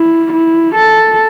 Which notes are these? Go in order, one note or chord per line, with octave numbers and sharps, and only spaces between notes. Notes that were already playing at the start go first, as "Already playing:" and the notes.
Already playing: E4
E4
A4